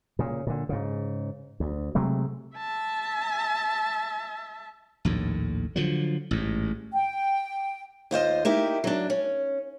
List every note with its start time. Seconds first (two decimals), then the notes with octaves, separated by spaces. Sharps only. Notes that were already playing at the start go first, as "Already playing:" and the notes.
0.19 A#2 C#3
0.47 A#2 D3
0.69 G#2 C#3
1.60 D2
1.95 C3 F#3 G#3 A3
2.57 E5 A5
5.05 A#1 D#2 A2
5.76 D3 F3 F#3
6.31 A1 G#2
6.93 G5
8.11 D#2 F4 C5 D#5
8.45 A#3 D#4 E4 G4
8.84 F#3 D4
9.10 C#4